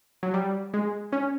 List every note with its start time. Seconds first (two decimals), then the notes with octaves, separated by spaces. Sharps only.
0.23 F#3
0.34 G3
0.74 G#3
1.12 C#4